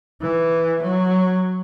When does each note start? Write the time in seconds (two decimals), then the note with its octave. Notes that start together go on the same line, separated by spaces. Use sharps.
0.21 E3
0.82 F#3